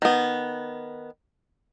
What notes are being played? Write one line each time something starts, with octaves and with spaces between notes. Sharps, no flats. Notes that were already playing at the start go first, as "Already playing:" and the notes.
D#3 B3